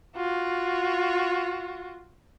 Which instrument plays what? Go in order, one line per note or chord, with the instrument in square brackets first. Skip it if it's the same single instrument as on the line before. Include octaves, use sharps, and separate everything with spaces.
[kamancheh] F4 F#4